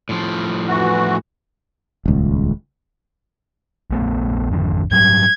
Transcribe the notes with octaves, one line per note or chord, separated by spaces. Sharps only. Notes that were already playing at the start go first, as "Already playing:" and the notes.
A2 F3
E3 F#4
D#1 C#2
A#1 A3 B3
G#1 F2 D3
G#2 F#3 G3 G#6